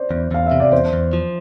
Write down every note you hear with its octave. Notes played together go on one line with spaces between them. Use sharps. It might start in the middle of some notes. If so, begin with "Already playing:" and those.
Already playing: C5 D5
E2
E2 F5
E5
C3
D5
E2 C5
E2
F3